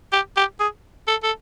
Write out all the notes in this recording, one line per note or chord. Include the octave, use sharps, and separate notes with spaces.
G4
G4
G#4
A4
A4